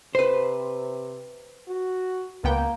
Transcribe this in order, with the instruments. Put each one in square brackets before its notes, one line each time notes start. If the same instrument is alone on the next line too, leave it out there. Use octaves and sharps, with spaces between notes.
[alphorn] C3 [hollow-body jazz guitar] B4 C5
[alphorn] F#4
[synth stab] C#2 B3 G5 [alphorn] A#3